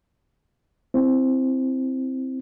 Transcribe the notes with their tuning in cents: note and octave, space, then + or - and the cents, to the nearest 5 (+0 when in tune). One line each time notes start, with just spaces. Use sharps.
C4 +0 E4 +10